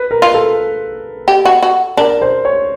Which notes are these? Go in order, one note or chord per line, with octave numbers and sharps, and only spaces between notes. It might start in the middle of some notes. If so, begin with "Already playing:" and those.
Already playing: B4
A#4
F4
A4
G4
F#4
F#4
D4 A#4
C5
C#5